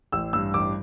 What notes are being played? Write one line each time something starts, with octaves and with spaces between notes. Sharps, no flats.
A1 E6
G2 E6
A1 D6